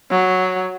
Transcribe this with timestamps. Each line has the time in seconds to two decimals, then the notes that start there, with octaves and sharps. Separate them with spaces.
0.11 F#3